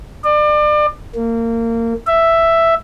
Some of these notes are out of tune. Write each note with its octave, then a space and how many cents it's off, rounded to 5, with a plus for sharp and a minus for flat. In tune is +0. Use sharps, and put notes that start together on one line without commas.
D5 +35
A#3 -25
E5 +5